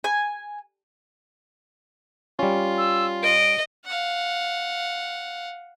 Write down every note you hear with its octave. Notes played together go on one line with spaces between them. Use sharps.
G#5
G3 C#4 F4
E6
D#5 D7
F5 F#5